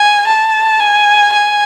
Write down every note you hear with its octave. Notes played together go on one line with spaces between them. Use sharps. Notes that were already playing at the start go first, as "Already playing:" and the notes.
Already playing: G#5
A5
G#5
G#5